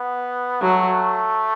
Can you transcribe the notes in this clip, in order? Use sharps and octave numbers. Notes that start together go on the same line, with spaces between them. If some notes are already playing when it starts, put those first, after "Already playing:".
Already playing: B3
F#3 A3